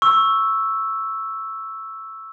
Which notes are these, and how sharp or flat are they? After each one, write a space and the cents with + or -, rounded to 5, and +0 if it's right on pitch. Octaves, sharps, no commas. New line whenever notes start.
C#6 +0 E6 +0